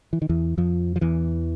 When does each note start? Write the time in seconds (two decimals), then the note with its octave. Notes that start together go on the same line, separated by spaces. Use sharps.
0.13 E3
0.22 D#3
0.29 E2 E3
0.57 F2 F3
0.96 F3
1.01 E2 E3